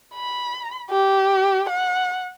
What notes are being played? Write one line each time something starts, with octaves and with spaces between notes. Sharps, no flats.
B5
G4
F#5